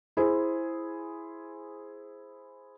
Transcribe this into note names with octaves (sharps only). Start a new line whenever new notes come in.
E4 G#4 C5